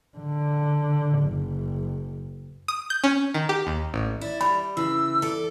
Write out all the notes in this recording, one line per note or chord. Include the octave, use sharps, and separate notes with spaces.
D3
F#1
D#6
G6
C#4
D#3
G4
D#2
A1
E4 D5
G3 B5
C#3 E3 E6
A4 D5